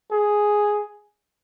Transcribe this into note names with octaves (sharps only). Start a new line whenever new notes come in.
G#4